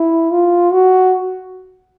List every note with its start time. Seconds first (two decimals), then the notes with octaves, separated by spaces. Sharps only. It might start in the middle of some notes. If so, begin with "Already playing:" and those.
Already playing: E4
0.31 F4
0.73 F#4